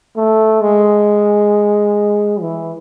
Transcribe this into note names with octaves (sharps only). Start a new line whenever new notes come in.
A3
G#3
E3